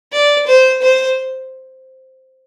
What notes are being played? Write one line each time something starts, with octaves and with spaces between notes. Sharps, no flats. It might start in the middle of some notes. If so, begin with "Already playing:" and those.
D5
C5
C5